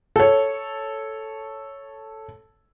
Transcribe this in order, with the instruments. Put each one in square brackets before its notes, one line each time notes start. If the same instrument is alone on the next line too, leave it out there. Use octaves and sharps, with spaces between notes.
[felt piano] A4 C#5